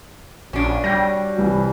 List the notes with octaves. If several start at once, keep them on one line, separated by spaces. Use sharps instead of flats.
A#1 C#4 D4 F#4
G3 G5 G6 A#6
C2 E3